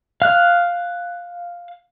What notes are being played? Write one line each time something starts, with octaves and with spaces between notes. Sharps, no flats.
F5 F#6